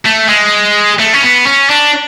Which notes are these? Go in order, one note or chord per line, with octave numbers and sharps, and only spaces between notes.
A3
G#3
A3
C#4
B3
C#4
D4